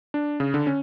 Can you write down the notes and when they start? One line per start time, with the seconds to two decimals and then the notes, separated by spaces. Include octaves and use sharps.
0.14 D4
0.40 C#3
0.54 D3
0.67 C#4